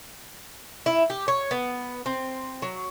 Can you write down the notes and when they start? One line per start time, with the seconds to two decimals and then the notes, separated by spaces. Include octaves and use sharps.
0.86 E4
1.10 G4
1.28 C#5
1.51 B3
2.06 C4
2.62 F#3